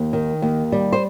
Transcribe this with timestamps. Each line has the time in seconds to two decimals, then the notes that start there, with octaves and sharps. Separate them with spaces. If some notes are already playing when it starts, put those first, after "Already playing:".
Already playing: D#2
0.13 D#3
0.42 D#2
0.72 G3
0.93 C5